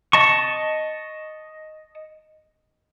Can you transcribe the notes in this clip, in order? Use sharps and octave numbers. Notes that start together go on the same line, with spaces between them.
D#5 A5 C#6